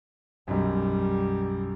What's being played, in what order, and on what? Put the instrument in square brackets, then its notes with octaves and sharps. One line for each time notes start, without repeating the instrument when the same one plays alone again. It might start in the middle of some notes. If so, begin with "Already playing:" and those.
[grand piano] B1 F#2 [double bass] G3